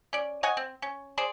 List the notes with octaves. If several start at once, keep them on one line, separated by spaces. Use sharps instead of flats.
C#4 D5
C#5 D#5 F#5 G#5
C4
C#4
G#4 C5 D5